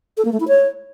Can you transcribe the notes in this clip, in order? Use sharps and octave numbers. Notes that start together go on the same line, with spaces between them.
A4
A#3
A3
E4
C#5